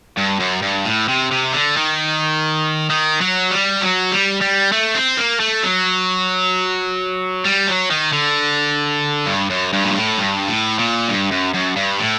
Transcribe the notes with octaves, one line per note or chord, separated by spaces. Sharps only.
G2
F#2
G2
A2
C3
C3
D3
D#3
D#3
F#3
G3
F#3
G3
G3
A3
C4
A#3
A3
F#3
G3
F#3
D#3
D3
G2
F#2
G2
A#2
A2
G2
A2
A#2
G2
F#2
F#2
G2
A2